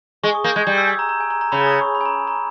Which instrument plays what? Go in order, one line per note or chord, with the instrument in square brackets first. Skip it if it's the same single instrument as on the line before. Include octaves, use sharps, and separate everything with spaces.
[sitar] G#3 [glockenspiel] C#6
[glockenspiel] D#6
[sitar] A#3 [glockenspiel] G6
[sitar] G#3 [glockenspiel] G#6
[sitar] G3 [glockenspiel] G6
[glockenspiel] E6
G#5
A#5
A#5
G#5
A#5
A#5
[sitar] C#3 [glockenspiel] B5
[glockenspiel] D#6
C#6
B5
G#5
A#5
A#5